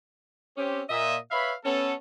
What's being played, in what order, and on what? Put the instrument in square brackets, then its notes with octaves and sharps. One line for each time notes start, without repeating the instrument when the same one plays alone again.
[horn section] C4 C#4 G4
A#2 D#5 E5
B4 C#5 E5 F5 B5
B3 C#4 A4